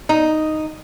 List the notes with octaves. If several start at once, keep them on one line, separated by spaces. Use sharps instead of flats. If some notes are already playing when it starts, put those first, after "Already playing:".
D#4